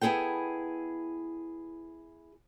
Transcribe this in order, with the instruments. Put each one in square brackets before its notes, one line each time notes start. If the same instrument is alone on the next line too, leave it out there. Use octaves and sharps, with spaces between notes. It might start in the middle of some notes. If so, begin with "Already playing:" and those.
[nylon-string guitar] B3 E4 G#4 A4 G5